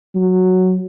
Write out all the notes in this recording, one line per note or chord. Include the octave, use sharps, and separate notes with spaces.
F#3